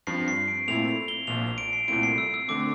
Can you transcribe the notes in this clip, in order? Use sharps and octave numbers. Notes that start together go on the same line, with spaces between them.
G2 F3 C4 C7
C7
D7
A#2 A3 C4 E4 F7
G7
A#1 A#2 F3 F7
D7
C7
C2 A#2 A3 C4 E4 D7
C7
E6
E6
D3 A3 C4 D6